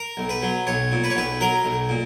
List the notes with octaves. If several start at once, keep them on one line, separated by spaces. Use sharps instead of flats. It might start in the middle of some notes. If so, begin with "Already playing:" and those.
Already playing: A#4
B1
B4
F#3
B1 C#5
A#2
B4
C#5
B1 B4
F#3 A#4
B1
A#2